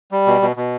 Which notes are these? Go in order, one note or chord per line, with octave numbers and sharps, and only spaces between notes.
G3
B2
B2
B2